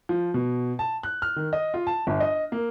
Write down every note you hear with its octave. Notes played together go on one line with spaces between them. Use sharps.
F3
B2
A5
F#6
F6
D#3
D#5
F4
A5
G1
D#5
A#3